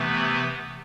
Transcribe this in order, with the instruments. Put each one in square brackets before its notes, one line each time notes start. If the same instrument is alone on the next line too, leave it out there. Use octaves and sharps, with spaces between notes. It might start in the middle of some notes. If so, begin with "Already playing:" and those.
Already playing: [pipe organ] C3 E3 A3 B3 B4